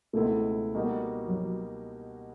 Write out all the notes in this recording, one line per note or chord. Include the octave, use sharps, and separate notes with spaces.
C#2 B2 G#3 A3 C4 E4
B2 G3 A#3 D#4 F#4
F#3